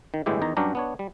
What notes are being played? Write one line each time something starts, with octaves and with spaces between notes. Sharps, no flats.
D#3
G1 A2 E3 G#3 E4 G4
E2 D#3 D#4 A#5
G2 F#3 C#4 D4 G4 A#5
B3 D4 C#5
G3